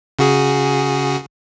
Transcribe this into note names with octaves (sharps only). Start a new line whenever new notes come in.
C#3 F#4 G#4